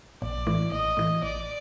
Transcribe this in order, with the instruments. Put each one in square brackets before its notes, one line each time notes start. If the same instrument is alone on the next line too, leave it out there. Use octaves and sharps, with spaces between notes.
[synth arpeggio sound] A#1 [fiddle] D5
[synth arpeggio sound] A2 E3
[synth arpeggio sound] A#1 [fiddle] D#5
[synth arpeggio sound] A2 E3
[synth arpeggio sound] A1 [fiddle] D5